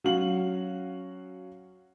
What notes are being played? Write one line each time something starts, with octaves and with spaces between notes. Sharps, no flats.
F#3 C#4 F#4 F5 F#7